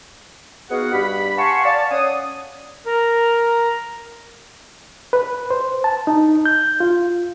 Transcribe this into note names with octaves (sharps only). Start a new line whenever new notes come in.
B3 D#4 F#4 G#4 F5 F#5
G2 G4 B5
F5 F#5 G#5 A5 C6 C#6
D5 F5 A5
C#4 D5 F#5 G#5 D#6
A#4
B4
C5
A5
D#4
G6
F4